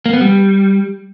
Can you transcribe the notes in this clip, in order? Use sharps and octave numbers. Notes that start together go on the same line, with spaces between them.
A#3
B3
G3